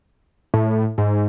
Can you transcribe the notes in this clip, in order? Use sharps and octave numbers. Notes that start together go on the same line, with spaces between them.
A2
G#2